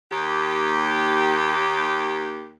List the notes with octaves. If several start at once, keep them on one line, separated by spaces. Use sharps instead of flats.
D#2 G4